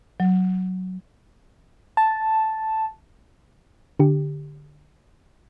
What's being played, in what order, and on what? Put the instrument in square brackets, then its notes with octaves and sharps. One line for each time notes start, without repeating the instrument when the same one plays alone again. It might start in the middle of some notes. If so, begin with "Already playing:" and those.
[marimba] F#3
[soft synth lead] A5
[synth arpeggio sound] D3 G4